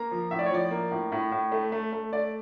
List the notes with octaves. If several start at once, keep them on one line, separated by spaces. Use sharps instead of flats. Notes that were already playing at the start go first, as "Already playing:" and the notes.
Already playing: A#3 A#5
F3
A2 E5
D5
C#5
F3 D5
A#3
A2
A2
A2
A3
A3
A3
A3 D5